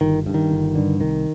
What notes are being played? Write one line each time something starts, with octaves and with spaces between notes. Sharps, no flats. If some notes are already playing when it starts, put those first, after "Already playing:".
G1 D#3
G2 D3
D#3
G1
G2 D3
C2 D#3